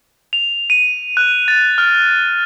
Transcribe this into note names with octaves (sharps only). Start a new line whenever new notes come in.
F7
D#7
F#6
A6
F6